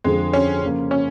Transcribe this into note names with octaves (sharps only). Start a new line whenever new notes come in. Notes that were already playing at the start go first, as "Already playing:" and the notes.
F2 D3 F3 G#3
C#4
C#3 F3 A#3
C#4